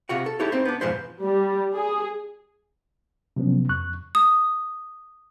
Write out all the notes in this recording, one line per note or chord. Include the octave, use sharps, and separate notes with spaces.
C3 F4 F#4 F#5
A4
D#4 E4 G4 A4 C#5
C4 D#4 C5
B3 D4
E2 G#2 B2 F3 B3 C5
G3
G#4
C3 F3 F#3 B3 C#4
F2 C#6 F#6
D#6